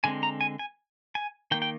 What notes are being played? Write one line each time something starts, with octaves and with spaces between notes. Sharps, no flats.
D3 G#3 C4 G#5
A#5
G#5
G#5
G#5
D#3 A#3 G5
G5